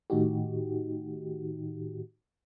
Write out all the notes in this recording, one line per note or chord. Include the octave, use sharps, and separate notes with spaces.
A2 D#3 D#4 F#4 G4